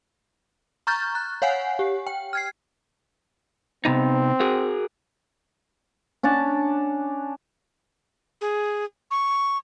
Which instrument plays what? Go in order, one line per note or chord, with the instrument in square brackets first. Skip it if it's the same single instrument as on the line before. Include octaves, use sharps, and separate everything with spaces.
[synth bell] A#5 C#6 F6 G6 A6
F#6
C#5 F5 F#5 G#5 C7
G4
G5
F6 G#6 C7
[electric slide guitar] C3 B3 D#4 [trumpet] C4
[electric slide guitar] F#4 G#4 A#4
[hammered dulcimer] C#4 D4 F#5 A5
[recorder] G#4
C#6